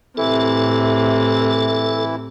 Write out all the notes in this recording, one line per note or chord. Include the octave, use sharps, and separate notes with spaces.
A2 C3 E3 E4 A4